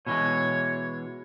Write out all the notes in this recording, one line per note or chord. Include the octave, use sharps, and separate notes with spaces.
B2 E3 G#3 C#5